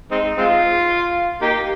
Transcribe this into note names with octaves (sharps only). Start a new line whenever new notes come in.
G#3 C4 D#4
G#3 C4 F4
A#3 D#4 G4